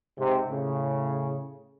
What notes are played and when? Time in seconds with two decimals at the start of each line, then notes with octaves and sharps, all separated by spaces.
0.18 G#2 C3
0.49 A2 C#3